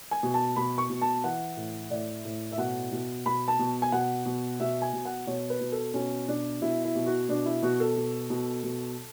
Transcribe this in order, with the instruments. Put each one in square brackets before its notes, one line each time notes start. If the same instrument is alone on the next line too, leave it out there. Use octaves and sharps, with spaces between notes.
[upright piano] G#5
B2
A5
B2 B5
C#6
B2
A5
E3 F#5
A2
A2 D5
A2
E5
B2 F#5
B2
B2 B5
A5
B2
G#5
B2 F#5
B2
B2 E5
G#5
B2
F#5
B2 C#5
B4
B2
A4
B2 C#4
B2 D4
B2 E4
E4
B2
F#4
B2 D4
E4
B2 F#4
A4
B2
B2
B2